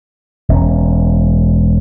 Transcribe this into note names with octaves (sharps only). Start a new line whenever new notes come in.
E1 C#4